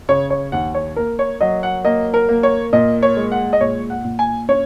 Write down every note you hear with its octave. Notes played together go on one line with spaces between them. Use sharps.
C#3 C#5
C#5
D#2 F#5
C#5
A#3 A#4
C#5
F#3 D#5
F#5
A#3 D#5
A#4
A#3
C#5
A#2 D#5
C#5
G#3
F#5
D#5
A#2 C#5
F#5
A#2
G#5
C#4 C#5